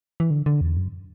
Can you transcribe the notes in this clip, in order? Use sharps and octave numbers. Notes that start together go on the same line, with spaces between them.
E3
D3
D3
E2
F#2